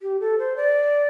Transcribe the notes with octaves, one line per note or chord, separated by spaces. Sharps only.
G4
A4
C5
D5